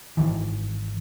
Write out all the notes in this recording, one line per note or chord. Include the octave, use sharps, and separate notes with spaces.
G#1 D#2 D#3 E3